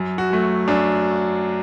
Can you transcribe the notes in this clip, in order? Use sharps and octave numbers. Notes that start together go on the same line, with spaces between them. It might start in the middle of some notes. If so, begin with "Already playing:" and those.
Already playing: F#2
F#4
F#3 A3
F#2 D4